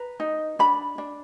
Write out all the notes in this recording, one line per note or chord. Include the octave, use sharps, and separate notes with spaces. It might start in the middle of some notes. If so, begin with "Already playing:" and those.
Already playing: B4 A#5
D#4
D4 B5
D4